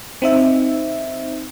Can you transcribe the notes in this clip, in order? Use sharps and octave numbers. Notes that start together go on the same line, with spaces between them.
C4 D#4 E5